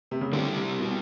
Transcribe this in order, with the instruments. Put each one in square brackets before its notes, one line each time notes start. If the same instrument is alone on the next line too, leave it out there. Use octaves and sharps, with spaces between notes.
[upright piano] C3
C#3
[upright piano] D3 [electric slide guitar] G3 C4 E4 G4
[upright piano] C3
B2